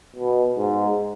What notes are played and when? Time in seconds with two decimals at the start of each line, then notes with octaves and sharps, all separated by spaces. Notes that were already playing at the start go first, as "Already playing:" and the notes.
0.16 B2
0.58 G#2